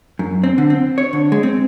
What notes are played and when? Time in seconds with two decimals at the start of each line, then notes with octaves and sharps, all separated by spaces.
0.19 F#2
0.44 C4
0.58 D3
0.70 C4
0.98 C#5
1.13 D3
1.32 G#3
1.43 C4